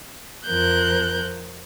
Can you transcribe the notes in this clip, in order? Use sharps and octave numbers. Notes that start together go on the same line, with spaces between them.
F2 F3 A#4 F#6 G6